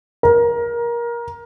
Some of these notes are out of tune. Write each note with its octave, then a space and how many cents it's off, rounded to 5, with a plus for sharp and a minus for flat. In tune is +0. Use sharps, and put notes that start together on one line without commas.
A#4 +20